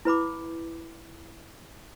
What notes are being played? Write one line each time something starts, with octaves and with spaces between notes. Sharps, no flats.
E4 B4 B5 D6